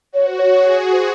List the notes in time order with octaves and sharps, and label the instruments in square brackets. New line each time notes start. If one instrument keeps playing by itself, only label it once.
[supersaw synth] F#4 [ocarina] C#5
[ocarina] C5
C#5
[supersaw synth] G#4
[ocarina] C5